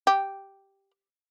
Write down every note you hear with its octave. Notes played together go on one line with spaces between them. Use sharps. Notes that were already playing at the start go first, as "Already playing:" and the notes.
G4